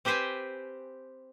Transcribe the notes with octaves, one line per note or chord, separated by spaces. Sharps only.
C4 G4 B4 C5 G5 G#5